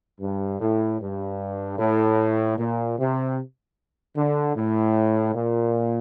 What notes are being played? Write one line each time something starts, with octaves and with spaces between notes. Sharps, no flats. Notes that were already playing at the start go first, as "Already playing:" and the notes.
G2
A2
G2
A2
A#2
C3
D3
A2
A#2